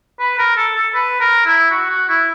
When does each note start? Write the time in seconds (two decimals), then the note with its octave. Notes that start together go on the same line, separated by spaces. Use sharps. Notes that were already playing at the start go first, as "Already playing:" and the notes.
0.20 B4
0.39 A#4
0.56 A4
0.76 A4
0.94 B4
1.20 A#4
1.45 E4
1.70 F#4
1.89 F#4
2.09 E4